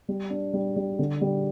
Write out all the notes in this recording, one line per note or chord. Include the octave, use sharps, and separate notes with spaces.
G3
D4
G3
G3
D3
G3